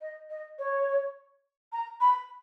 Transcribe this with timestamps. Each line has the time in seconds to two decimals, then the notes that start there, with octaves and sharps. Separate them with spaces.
0.01 D#5
0.29 D#5
0.58 C#5
1.72 A#5
2.00 B5